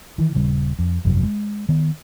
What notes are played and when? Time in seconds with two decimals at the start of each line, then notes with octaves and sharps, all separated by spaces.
0.18 D#3 E3
0.34 D#1 C#3 G3
0.79 F2
1.05 G1 F2 C3 F#3
1.23 G#3
1.69 D#3 B3